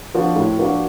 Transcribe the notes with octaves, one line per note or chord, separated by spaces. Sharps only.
F3 A#3 D4 F#4
A2
F3 A#3 D4 F#4